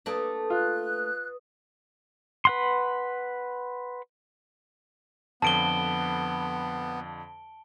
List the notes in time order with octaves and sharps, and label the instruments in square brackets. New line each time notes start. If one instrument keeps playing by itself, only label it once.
[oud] A3 A#3 D4 [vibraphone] B4 D#6
[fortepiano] F4 [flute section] F#6
[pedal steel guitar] B4 F#5 C6
[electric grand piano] F2 D3 F3 [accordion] B3 [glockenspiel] A5 D7 G7